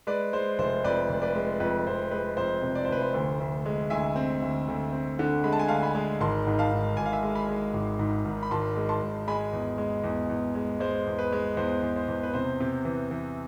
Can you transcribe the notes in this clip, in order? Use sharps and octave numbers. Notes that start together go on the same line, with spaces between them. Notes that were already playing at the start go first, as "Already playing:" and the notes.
G#3 B4 D5
G#3 C5
F1 C5
F2 B4 D5
F1
B4 D5
G#3
F2 B4
F2 C5
G#3 B4
F2 C5
C3
D5
C5
F1 B4
C5
D2
D2
G#3
D2 E5 G#5
C4
D2
D2
C4
D3
G#3 B5
A5
G#5
D2 F5 A5
G#5 B5
G#3
G#1 A5 C6
G#2
F5 A5
G#2
G#1 G#5
F5
E5 G#5
G#3
G#5 B5
G#3
G#1
G#2
G#1
B5
G#1 A5 C6
G#3
A5 C6
G#1
G#3 G#5 B5
E2
G#3
E2
E2
G#3
G#3 C5
E2
B4
G#3
E2 C5
E2
C5
E2
B4
C3 C5
C3
E3
E3